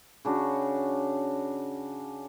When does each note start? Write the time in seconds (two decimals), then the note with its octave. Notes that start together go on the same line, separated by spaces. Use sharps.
0.25 C#3 D4 F#4